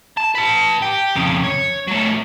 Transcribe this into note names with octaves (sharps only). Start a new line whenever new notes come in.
A5
B4 A5
G4
F2 C#3
C#5
F#3 A3